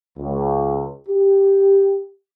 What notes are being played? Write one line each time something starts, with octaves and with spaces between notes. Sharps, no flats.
C#2
G4